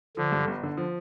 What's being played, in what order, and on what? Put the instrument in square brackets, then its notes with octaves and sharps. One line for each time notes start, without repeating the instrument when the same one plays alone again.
[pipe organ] D3 [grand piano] F3
[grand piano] G2
G1
D3
F3